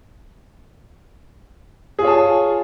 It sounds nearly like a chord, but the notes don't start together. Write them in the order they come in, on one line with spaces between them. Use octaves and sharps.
G#4 F4 C#5 A5 G#5